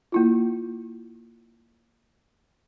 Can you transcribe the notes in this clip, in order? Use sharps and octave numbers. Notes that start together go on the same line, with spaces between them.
A#3 E4 F4